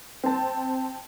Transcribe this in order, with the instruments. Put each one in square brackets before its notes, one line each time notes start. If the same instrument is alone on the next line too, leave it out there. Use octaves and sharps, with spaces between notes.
[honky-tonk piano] C4 A5